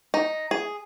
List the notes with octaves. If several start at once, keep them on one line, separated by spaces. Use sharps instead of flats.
D#4
G#4